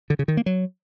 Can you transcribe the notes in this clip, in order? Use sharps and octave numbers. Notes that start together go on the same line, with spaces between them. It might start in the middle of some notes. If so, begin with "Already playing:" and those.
D3
C#3
D#3
A#3
F#3